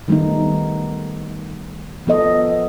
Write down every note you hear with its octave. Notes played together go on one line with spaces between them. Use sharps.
D#3 G3 A3 B3 D#4
F3 B3 A4 D#5